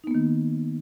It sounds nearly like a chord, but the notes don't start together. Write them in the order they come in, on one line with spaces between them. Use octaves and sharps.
D#4 B3 A#3 D#3